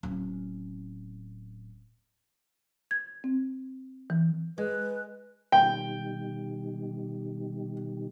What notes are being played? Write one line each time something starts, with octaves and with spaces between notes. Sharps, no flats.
D1 C#4
G#6
C4
E3
G#3 B4
B2 D#3 G3 G5